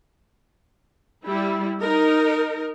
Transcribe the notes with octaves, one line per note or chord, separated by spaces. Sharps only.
G3 E4
D#4 A#4